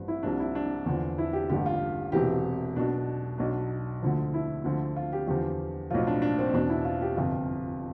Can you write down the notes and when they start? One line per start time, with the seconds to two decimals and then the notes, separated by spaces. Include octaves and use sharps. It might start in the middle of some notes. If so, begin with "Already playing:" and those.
Already playing: A1 G2 F3
0.08 E4
0.23 C2 C3 F3 D4
0.39 E4
0.55 D4
0.86 E2 D3 F3
1.18 E4
1.33 G4
1.49 A1 G2 D3 G4
1.66 F4
2.12 E1 E2 C3 E3 G4
2.76 B1 B2 D4
3.38 B1 B2 D4
4.02 D2 D3 F3
4.34 E4
4.64 D2 D3 F3
4.96 F4
5.12 G4
5.27 E2 D3 F3 G4
5.90 B1 A2 F3 F4
6.07 D4
6.22 D4
6.39 C4
6.53 E2 B2 D4
6.69 E4
6.85 F4
7.02 G4
7.16 G1 F2 C3 F4